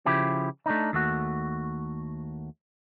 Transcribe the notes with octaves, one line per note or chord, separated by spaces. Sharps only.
C#3 F3 E4 G4
A3 D4 D#4
D#2 A3 F#4